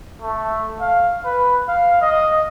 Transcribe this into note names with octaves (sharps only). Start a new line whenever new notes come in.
A3
F5
B4
F5
D#5